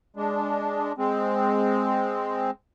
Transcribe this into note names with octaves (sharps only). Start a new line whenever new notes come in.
G#3 D4
G#3 C4